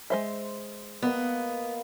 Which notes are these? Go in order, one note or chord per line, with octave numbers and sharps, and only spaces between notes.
G#3 C5 E5
A#3 B3 D#5